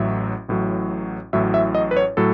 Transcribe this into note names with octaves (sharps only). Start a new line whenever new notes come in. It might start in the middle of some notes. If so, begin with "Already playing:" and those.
Already playing: A1 A2 F#3 E5
A1 A2 F#3
A1 A2 F#3 E5
E5
D#5
B4
C#5
A2 F#3 A4